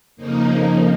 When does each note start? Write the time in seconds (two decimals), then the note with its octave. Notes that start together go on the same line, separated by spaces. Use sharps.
0.16 F2 C#3 F3 A#3 D#4